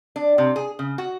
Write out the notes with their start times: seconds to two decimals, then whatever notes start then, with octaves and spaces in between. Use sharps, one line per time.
0.16 D4
0.38 C3
0.56 G#4
0.79 C#3
0.98 F#4